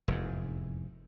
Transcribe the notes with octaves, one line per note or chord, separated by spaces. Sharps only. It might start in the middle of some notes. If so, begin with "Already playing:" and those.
F1 E2 G#2